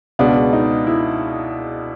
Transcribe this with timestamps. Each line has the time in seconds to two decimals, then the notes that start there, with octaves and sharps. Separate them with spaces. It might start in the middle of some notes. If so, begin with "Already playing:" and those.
0.19 C#2 B2 G#3 B3 D4
0.53 D#4
0.87 E4